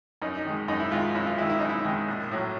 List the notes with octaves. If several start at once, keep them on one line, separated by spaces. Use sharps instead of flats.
F#2 D#4
D#4
D#3 G#3
F#2 D#4
E4
D#3 G#3 F4
F#2 E4
F4
D#3 G#3 E4
E4
F#2 D#4
E4
D#3 G#3
A#1
A2 F#3